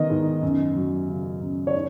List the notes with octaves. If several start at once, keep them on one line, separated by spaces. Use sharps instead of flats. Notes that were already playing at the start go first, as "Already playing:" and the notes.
Already playing: D#3 B3 D#5
G#2
F#2
F#3
C#3
F#2
C#5
D#4